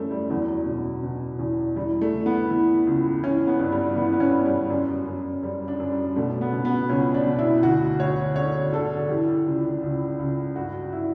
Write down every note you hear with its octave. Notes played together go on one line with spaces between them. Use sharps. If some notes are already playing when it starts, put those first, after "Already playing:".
Already playing: F#2 E3 G3 A3
G3
E2 F#3
B2
B2
E2
E3 G3
A3
E3
B3
E3
C#2
E3 C#4
B3
G2
G3
E3 B3
B3
C#4
G2
G3
F#2
F#2
F#2 G3
D4
F#2
G3
B2 A3
B3
B2
B3
C#2 C#4
D4
B2
E4
D2 F#4
D2 C#5
D3 C#5
D3 A4
E3 G4
C#2
C#2
C#2
G2 F#4
E4